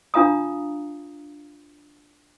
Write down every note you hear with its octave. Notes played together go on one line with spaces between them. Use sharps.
D4 F4 F5 A#5 D#6